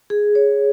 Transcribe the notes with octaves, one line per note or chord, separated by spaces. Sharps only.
G#4
C#5